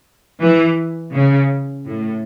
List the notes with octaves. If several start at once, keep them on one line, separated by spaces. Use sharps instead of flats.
E3
C#3
A2